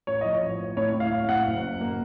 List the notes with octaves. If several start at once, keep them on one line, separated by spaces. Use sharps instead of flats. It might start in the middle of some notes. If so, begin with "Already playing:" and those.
A1 C#5
F3 D#5
C#5
A1
A1
A2 C#5
A2
F5
A2 F5
F5
A2 F#5
F#1
F#2
A#3